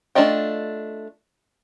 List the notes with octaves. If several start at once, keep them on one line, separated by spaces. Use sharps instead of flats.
A3 D4 F4 D#5 G5